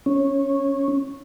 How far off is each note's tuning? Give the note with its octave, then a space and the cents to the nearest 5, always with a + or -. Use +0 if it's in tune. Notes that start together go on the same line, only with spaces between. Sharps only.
C#4 -15